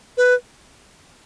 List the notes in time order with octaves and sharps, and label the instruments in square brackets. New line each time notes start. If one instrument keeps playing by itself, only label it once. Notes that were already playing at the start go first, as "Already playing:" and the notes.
[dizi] B4